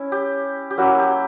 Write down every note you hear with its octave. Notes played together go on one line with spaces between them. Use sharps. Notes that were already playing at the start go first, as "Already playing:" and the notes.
Already playing: C#4 E4
G4
G4
F#3 A#3 C#4 E4 F#4
G4